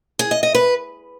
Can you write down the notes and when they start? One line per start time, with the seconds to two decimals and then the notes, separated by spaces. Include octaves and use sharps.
0.19 G#4
0.31 D#5
0.43 D#5
0.55 B4